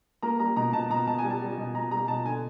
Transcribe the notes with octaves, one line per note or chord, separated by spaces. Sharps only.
A#3 A#5
G3 A#5
B2 A#5
B2 A5
B2 A#5
B2 A5
G#5
G3
A5
G3
B2
B2 A#5
G3 A#5
B2 A5
D3 G#5